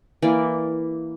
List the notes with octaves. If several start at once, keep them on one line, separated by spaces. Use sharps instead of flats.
E3 A#3 D5